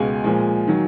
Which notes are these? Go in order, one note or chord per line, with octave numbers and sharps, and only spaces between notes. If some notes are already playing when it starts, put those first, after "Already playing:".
Already playing: C#2 B2 G#3 F5 G#5
A#2 F3 G#3
D#3 F#3